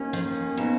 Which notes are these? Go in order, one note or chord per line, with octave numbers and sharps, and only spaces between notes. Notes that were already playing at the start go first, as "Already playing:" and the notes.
Already playing: D#2 D#3 A#3 C#4
F3
B2 F3 B3 D#4